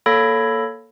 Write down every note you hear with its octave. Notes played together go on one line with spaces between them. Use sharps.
A#3 A4 C#5 B5 G#6 A#6